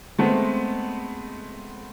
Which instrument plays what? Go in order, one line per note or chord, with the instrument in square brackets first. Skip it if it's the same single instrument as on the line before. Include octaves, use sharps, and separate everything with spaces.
[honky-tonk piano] G#3 A3 B3 C4